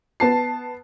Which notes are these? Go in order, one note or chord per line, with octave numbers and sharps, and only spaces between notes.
B3 A5 C7